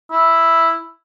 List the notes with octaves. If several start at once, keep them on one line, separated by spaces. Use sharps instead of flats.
E4